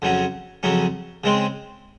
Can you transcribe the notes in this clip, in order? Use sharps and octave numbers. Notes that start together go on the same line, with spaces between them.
F2 C#3 F#3 C#4
F2 C#3 F#3 C#4
C#3 G#3 C4